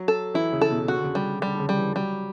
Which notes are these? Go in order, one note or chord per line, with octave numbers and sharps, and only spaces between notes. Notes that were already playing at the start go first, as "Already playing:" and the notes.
Already playing: F#3
A4
E3 E4
C#3
A4
B2
C#3 F#4
D3
C#3
G3
D3 G3
D3
C#3
G3
E3
F#3 G3